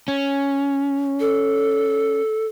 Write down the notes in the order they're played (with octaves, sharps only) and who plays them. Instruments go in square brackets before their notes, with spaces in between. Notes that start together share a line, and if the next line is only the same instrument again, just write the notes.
[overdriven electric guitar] C#4
[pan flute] A4